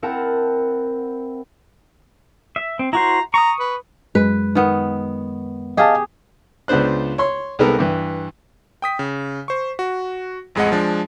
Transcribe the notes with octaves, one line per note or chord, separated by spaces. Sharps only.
C4 E4 A#4 F#5 A5
E5
C4
E4 F#4 C5 A#5
A#5 C#6 D#6
B4
F#2 G#3 B4
D#3 B3
G4 G#4 D#5 F5 A5
C#2 C#3 B3 D4 C5 F#6
C#5 C6
C2 G#3 B3 D#4 A4 A#4
G2 E3
G5 D#6 B6
C#3
C5 C#6
F#4
A1 F2 G#3 G#4 D#5 F#5
F3 G#3 D4